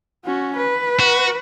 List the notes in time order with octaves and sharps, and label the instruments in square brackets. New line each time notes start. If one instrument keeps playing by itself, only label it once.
[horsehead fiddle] C#4 F#4
B4
[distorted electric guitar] F#4